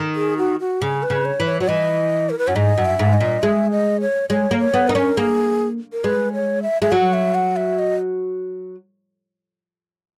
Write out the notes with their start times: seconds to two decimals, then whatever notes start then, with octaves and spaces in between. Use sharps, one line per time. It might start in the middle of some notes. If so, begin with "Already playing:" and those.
Already playing: D#3
0.15 G#4
0.37 F#4
0.60 F#4
0.82 C#3 G#4
1.03 B4
1.10 C#3
1.25 C#5
1.40 E3
1.46 C#5
1.60 F#3 C#5
1.68 E3 D#5
2.30 A#4
2.38 B4
2.47 F#2 C#5
2.55 G#2 D#5
2.78 F#2
2.85 E5
2.99 G#2
3.13 D#5
3.20 A#2
3.42 G#3 E5
3.71 D#5
4.01 C#5
4.30 G#3 C#5
4.51 A#3
4.59 C#5
4.74 B3
4.88 D#4 A#4
4.95 C#4
5.17 A#3 G#4
5.92 A#4
6.04 G#3 B4
6.33 C#5
6.62 E5
6.82 G#3 E5
6.91 F#3 F#5
7.13 E5
7.34 F#5
7.56 E5
7.79 D#5